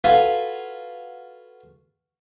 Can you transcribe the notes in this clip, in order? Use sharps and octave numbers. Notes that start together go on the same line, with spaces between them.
F4 F#4 A4 B4 F5 G#5